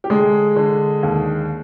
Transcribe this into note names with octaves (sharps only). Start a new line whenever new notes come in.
G4
D3 G#3 G#4
D3
D#2